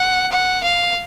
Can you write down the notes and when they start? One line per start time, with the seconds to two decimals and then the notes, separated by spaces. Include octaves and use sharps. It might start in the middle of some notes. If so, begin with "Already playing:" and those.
Already playing: F#5
0.32 F#5
0.64 F5